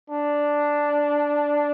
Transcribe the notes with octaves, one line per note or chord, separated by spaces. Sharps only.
D4